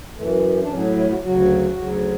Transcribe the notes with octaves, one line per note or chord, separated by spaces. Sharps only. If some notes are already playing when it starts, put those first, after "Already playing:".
F#2 E3 A3
D4
A2 C#3 F#3 C#4
E3 E4
F#3 F#4
D2 C#3 F#3 F#4
D2 C#3 F#3